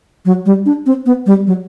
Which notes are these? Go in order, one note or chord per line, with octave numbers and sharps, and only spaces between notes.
F#3
G3
D4
C4
B3
G3
F#3